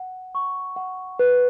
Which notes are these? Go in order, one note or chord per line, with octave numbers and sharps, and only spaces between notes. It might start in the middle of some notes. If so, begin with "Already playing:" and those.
Already playing: F#5
C#6
F#5
B4